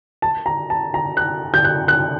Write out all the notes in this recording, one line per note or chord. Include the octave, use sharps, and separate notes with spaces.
A5
A#5
A5
A#5
F#6
G6
F#6
F#6